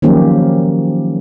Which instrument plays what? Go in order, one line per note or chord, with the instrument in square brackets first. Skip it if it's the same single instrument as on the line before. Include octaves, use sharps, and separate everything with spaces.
[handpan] D#3 F3 F#3 A#3 C#4 G4